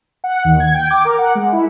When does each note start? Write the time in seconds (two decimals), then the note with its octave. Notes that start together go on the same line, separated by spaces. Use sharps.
0.24 F#5
0.45 D#2
0.60 G#6
0.74 G5
0.91 D6
1.05 A#4
1.18 F#5
1.35 G#3
1.52 E4